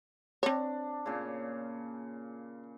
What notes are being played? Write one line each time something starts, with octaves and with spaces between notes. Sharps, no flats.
C4 D4 C#5
A#2 C#3